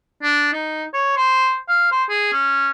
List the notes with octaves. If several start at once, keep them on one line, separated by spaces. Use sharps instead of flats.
D4
D#4
C#5
C5
F5
C5
G#4
C#4